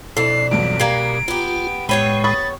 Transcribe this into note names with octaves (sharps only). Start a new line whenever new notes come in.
F2 B2 D4 E4 A4 C7
E2 G2 F#3 D7
G3 A#3 A#5 G#6 C7
B3 F4 G4
A2 G#3 B3 C#5 G5 B5 D#7
B5 C#6 D#6 A6